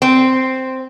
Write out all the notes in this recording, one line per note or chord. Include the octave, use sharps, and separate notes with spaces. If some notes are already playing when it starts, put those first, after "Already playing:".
C4